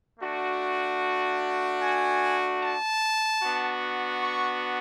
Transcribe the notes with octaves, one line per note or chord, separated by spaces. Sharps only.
A3 D4 F#4
G#5
A5
B3 D4 F#4
C#6